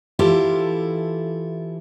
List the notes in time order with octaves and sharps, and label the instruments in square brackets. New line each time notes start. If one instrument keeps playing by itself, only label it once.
[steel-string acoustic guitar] E3 E4 F4 G4 A4